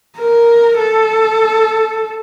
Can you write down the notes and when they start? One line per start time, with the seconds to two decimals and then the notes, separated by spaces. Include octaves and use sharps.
0.17 A#4
0.78 A4